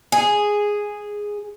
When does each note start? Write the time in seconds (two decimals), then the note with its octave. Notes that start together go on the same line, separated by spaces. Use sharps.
0.12 G#4